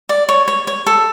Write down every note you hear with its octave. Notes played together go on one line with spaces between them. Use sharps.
D5
C#5
C#5
C#5
A4